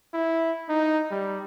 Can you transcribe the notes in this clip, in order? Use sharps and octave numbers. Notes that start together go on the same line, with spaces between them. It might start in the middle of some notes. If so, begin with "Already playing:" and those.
E4
D#4
G3